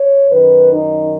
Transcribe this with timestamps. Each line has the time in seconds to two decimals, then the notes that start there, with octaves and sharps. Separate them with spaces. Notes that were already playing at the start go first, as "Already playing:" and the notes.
Already playing: C#5
0.30 F#2 D#3 B4
0.72 D#4